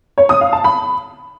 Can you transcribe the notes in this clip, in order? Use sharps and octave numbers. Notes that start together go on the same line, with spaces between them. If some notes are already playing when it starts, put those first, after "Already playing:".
C#5
D#6
F5
A5
B5